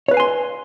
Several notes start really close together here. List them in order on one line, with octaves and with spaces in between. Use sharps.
C#5 B4 F5 G#5 C6